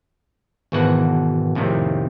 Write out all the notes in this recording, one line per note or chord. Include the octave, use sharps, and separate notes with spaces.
G#1 B2 E3 F#4 F#5
F2 A2 C3 D#3